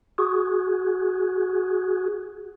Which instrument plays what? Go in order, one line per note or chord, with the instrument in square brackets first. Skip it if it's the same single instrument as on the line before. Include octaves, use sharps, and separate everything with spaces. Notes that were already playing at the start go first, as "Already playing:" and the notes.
[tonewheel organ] F#4 G#4